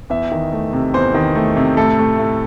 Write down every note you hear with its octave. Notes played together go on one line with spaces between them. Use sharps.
E2 E5
D#3
A3
C3
E2 C5
D#3
A3
C3
A2 A4
A3
A2